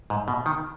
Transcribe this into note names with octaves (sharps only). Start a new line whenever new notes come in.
G#2
B2
D#3